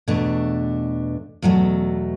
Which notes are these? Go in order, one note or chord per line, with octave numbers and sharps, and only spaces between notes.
E2 B2 A3 D4
E2 B2 F#3 A3